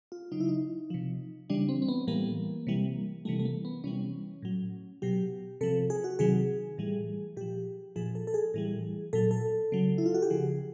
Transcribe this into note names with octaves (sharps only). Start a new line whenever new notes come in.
F4
C#3 F#3 D#4
E4
D#4
C3 F3
C#3 E3 G3 D4
C4
C4
B3
A2 E3 G3 A#3
C3 E3 G3
C3 E3 G3 A3
A3
A#3
B3
C3 E3 G3 C#4
A2 F#3
B2 F#3 G4
C3 F3 A4
G#4
F#4
C3 D#3 F#3 G#4
A2 E3 G3
A#2 F3 G4
A#2 F3 G#4
A4
A4
G#4
A2 E3 G3
A#2 F#3 A4
A4
C#3 F#3
E4
F4
F#4
G4
C#3 F3 G#4